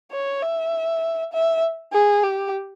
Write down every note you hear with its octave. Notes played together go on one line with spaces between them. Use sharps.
C#5
E5
E5
G#4
G4